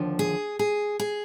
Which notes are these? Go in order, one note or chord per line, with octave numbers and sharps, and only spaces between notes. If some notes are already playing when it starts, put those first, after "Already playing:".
Already playing: D#2 D3 F3
G#4
G#4
G#4